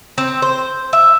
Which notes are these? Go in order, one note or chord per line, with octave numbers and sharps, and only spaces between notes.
C4
C5
E5